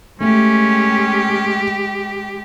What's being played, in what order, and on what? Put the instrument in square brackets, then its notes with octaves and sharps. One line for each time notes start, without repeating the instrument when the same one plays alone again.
[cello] G#3 G4 [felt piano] A3 [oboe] C#4